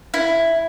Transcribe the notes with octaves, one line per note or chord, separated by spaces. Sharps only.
E4